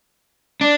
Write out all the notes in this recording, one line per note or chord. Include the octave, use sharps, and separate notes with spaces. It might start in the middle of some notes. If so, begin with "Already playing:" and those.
D4